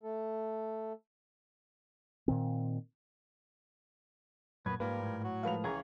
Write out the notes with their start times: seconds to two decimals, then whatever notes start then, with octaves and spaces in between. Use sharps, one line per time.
0.03 A3 A4
2.28 A#2 D#3 C4
4.66 F#2 A#2 A#3 B3 B4 G#6
4.80 G#2 F3 G3 A#3 F4 A#4 B4 B5
5.03 A2
5.24 F#3 F#4
5.43 F3 G#3 A#4 B4 F5 F7
5.64 C#2 E3 G#4 C#5 A#5 G#6